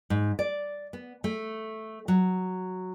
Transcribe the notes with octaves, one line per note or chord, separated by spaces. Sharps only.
G#2
D5
B3
A3
F#3